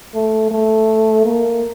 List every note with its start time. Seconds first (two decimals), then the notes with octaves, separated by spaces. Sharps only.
0.15 A3
0.51 A3
1.25 A#3